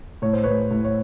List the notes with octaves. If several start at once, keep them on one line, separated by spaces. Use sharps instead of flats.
A2 C#5
C5
A2 B4 C#5
A2
C#5